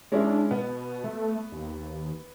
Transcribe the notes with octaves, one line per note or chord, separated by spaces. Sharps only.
G#3 C#4 D4 E4
B2 B3
A3
D#2